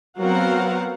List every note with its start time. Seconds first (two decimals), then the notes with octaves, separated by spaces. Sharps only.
0.20 F#3 B3 C4 A#4 F5 F#5